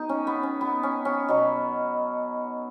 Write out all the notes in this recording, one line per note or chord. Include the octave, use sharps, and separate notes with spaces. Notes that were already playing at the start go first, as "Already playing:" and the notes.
Already playing: B2 D#4
C#4
B3
C#4
B3
C#4
C#4
B2 F#3